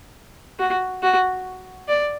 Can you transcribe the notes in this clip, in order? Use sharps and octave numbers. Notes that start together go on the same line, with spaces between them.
F#4
F#4
D5